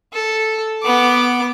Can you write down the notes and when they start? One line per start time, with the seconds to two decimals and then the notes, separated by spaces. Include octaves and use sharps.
0.13 A4
0.83 B3 D6